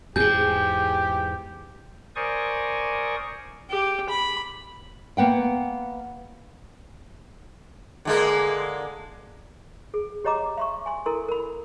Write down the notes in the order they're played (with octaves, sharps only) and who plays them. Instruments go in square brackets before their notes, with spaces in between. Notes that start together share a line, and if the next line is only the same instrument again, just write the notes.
[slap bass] E2 G#2 [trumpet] G4 [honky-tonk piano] G#4 [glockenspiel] G6
[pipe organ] A#4 C5 D5 G#5 C#6 D#6
[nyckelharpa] G4
B5
[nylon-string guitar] A#3 B3 F#5 G5
[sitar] D3 G#3 A#3
[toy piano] G#4
G4 C#5 D#5 A#5 D6
E5 C6 C#6
G#5 C6
E4 A4 A#4 C6
A#4 B5